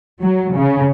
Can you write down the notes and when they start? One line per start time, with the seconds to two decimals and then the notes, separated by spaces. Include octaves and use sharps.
0.21 F#3
0.56 C#3